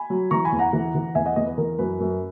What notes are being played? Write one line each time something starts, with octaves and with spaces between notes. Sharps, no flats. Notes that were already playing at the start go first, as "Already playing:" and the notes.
Already playing: G#5 B5
F#3
E3 A#5 C#6
G#5 B5
E2
F#5 A#5
E3
E3
E2 E5 G#5
D#5 F#5
E2 B4 D#5
B4
E3 A#4
F#2 B4
F#2